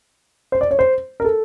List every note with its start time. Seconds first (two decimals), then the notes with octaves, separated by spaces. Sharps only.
0.52 C5
0.61 D5
0.71 C#5
0.79 C5
1.20 A#4
1.24 A4